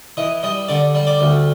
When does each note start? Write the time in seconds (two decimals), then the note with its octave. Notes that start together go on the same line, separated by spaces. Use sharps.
0.17 E3 D#5
0.43 G3 D#5
0.68 D3 D5
0.95 G3
1.07 D5
1.21 D2